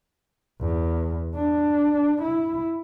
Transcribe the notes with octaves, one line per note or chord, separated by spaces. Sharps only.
E2
D4
E4